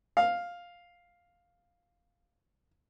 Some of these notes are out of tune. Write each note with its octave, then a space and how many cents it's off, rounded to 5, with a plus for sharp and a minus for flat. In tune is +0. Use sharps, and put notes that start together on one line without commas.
F5 +5